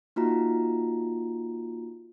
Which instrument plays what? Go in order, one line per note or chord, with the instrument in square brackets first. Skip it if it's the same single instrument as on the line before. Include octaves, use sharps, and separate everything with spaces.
[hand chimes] A#3 D#4 F4 F#4 A#5